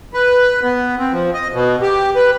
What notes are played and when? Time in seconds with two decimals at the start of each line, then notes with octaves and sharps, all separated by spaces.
0.14 B4
0.63 B3
0.99 C4
1.12 F3
1.34 D#5
1.53 B2
1.82 G4
2.16 B4